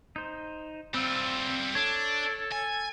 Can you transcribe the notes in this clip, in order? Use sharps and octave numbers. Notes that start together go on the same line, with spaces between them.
D#4 C5
G3 C4 F4 E6
D4 A4 C#5
G#5